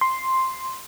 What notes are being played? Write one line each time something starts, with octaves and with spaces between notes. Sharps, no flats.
C6